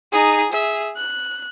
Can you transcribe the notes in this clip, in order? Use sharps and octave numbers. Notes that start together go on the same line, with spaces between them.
D#4 G#4
G#4 E5
F#6